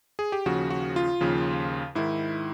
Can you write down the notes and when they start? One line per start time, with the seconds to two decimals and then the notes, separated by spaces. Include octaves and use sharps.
0.19 G#4
0.32 G4
0.46 D#2 C#3 F3 F#4
0.70 F#4
0.96 F4
1.21 D#2 C#3 F3
1.95 G#2 D#3 E4